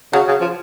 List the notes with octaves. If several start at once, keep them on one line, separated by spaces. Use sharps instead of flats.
C#3 F#3
C#3
F3